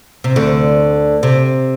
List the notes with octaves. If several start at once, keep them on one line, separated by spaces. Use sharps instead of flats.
C3
D2 D3
C3